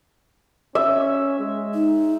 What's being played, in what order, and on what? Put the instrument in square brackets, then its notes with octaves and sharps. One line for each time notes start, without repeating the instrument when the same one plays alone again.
[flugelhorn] C#4 [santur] E5
[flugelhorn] G#3
[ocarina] D#4